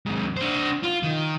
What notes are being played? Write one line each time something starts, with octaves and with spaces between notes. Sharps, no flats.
D#2 G#2
D4 C5
F4
D#3